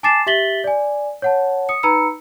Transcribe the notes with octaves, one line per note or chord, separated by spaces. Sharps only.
G#5 A5 D6 A6 C7 E7
G4 E5 A6 B6 F#7 G7
D5 G#5
C#5 F#5 A5
D#6 C#7
D#4 B4 A#5 B5 E6 C#7